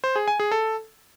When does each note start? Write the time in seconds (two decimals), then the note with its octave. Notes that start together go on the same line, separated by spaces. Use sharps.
0.04 C5
0.16 G#4
0.28 G#5
0.40 G#4
0.52 A4